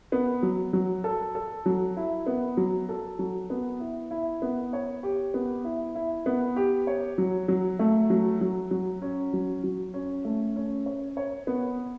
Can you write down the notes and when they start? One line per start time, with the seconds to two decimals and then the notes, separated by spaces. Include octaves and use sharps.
0.12 B3
0.43 F#3
0.73 F#3
1.04 A4
1.35 A4
1.66 F#3
1.97 E4
2.27 B3
2.57 F#3
2.89 A4
3.19 F#3
3.50 B3
3.80 E4
4.11 E4
4.42 B3
4.73 C#5
5.03 G4
5.34 B3
5.65 E4
5.95 E4
6.26 B3
6.56 G4
6.87 C#5
7.18 F#3
7.48 F#3
7.79 A3
8.10 F#3
8.41 F#3
8.71 F#3
9.02 C#4
9.33 F#3
9.64 F#3
9.94 C#4
10.25 A3
10.56 C#4
10.86 C#5
11.17 C#5
11.47 B3